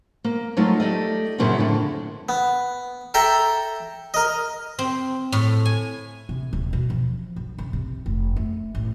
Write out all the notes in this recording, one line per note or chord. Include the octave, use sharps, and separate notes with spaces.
A#3
F#3 A3 D#4 F4
A3 G4 D5 D#5
F#2 A#2 C#3 A#3 D4 E4
F2 A2 D3
B3
A4 E5 G5 A#5
A#4 D#5
C4
A2
G#5
C3
D#1
B2
F3
B1
C#3
C3
F1
A3
A1